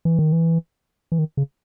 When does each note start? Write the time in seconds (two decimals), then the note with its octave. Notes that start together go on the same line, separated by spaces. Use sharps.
0.05 E3
0.19 D#3
0.32 E3
1.12 E3
1.19 D#3
1.37 C#3